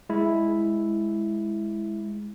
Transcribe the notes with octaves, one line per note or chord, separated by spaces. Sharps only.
G#3 E4